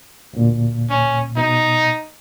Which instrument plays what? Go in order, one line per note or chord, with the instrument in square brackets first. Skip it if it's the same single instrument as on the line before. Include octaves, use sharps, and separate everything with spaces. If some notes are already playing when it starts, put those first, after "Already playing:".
[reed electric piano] D2 A#2
[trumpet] C#4
[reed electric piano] B2 [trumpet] D#4